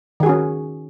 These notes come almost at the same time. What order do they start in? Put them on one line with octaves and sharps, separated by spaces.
D#3 G#4 F#4 C#4